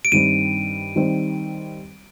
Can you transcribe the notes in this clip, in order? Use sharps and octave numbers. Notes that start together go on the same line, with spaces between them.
D7
G2 D#3 G3 C4 D#7
D#3 G3 C4